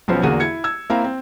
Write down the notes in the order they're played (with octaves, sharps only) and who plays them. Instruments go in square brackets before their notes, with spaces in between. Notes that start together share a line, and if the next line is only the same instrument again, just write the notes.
[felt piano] B1 F3 B3 C#4 C5
E2 D3 A#3 F#4 G#4 D#7
E4 G#6 C#7
E6 G#6
A#3 C4 E4 F5 A#5
C4